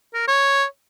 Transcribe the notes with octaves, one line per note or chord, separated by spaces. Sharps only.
A#4
C#5